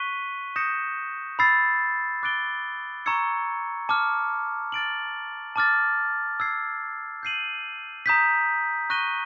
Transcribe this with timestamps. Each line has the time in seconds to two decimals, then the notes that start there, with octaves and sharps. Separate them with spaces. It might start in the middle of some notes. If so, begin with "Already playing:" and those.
Already playing: C#6 F#6 B6 D#7 G7
0.56 D#6 G6 A#6 C#7 E7
1.39 B5 E6 A6 C7
2.23 D6 F#6 A6 D7 G7
3.06 A#5 C#6 E6 G#6 C#7
3.89 A5 D6 F6
4.72 F6 A6 D7 F#7
5.56 A5 D6 F6 A6
6.40 E6 G#6 C7
7.23 G6 C7 D#7 F#7
8.06 A#5 D#6 G6 B6
8.90 C#6 F#6 A#6 D#7 G7